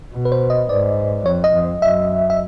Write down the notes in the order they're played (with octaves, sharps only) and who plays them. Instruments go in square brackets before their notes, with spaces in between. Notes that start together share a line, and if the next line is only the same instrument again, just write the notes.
[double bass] B2
[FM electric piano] B4
C5
D#5
[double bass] G#2 [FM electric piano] D5
[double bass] F2 [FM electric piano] C#5
[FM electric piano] D#5
[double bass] F2
[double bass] F#2 [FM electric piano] E5
[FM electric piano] E5